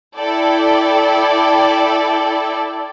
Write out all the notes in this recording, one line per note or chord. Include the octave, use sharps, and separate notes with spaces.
E4 A4 D5 G5